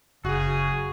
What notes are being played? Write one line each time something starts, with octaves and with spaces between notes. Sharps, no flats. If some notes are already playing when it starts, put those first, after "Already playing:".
F#1 C#3 F#4 G#4